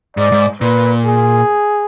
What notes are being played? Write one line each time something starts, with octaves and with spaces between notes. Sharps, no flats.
G#2 D5
G#2
A#2 B4
G#4